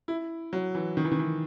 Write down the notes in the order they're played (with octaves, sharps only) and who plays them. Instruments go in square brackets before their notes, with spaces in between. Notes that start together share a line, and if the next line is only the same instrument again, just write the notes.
[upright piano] E4
F#3
E3
D#3
E3
D#3
E3